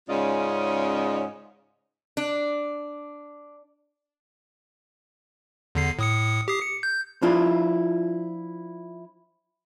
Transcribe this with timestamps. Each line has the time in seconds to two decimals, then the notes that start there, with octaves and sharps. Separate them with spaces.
0.09 G#2 C#3 C#4 F4 D5 D#5
2.17 D4
5.75 E2 D3 C7
5.99 A2 D#6 C#7
6.48 G4 D#6 C7
6.61 C#7
6.83 G6
7.22 F3 D4 E4 F4